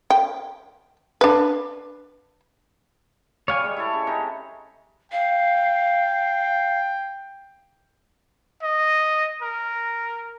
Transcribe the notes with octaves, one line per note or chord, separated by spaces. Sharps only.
G5
D4 B4
G3 C#5 F5 G#5
G#3 C#5
E4 A4
C#3
C3 D#4
F5 G5
D#5
A#4